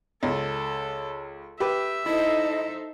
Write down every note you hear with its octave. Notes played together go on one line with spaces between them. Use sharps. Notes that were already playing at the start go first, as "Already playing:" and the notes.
C#2 A4
G4 B4 E5
D#4 E4 A4 C5 D#5